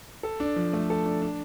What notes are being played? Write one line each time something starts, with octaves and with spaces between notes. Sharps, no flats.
A4
D4
F3
A3
A4
D4
D4